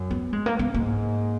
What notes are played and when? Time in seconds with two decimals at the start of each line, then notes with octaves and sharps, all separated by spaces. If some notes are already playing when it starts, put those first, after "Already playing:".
Already playing: F#2
0.11 B3
0.33 G#3
0.46 A#3
0.59 B3
0.74 G#2 A#3